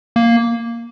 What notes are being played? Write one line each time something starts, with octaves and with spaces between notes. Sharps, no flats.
A#3